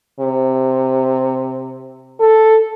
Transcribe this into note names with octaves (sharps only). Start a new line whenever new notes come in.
C3
A4